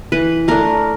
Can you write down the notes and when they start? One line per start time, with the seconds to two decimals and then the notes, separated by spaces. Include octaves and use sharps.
0.12 E3 B4
0.48 A3 D4 A#4